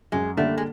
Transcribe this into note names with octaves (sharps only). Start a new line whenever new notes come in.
F#2 G#3
D3 G3 A3 A#3 D4
G#3